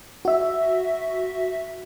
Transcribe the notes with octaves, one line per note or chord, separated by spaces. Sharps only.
F#4 E5